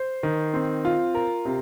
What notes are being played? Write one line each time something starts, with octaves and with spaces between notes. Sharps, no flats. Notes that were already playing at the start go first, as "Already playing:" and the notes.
Already playing: C5
D#3
C4
F4
A#4
C3